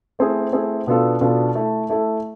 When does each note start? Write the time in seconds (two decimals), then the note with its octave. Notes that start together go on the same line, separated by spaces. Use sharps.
0.19 A3 C4 E4 G#4
0.53 A3 C4 E4 G#4
0.87 B2 B3 D4 F4 A4
1.21 B2 B3 D4 F4 A4
1.55 A3 E4 A4
1.89 A3 E4 A4